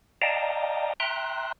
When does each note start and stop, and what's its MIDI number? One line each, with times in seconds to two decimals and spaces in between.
0.22 0.93 74
0.22 0.93 75
0.22 0.93 77
0.22 0.93 79
0.22 0.93 81
0.22 0.93 82
1.00 1.52 76
1.00 1.52 79
1.00 1.52 82
1.00 1.52 84
1.00 1.52 90